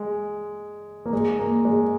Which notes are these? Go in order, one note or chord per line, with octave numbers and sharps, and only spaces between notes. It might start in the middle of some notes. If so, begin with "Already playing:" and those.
Already playing: G#3
A#3
G#3
A#3
G#3